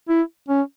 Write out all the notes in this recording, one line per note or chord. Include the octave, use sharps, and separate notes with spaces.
E4
C#4